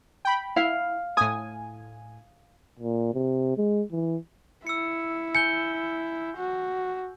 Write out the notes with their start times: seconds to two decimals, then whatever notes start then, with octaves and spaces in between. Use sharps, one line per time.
0.25 G5 B5
0.56 E4 F5
1.17 A2 G#5 D#6
2.79 A#2
3.14 C3
3.57 G#3
3.92 E3
4.67 E4 E6 C#7
5.35 G#5 G6 C#7 G7
6.37 F#4